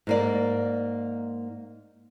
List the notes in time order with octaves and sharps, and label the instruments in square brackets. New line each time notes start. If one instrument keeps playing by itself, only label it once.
[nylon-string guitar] G#2 A#3 D5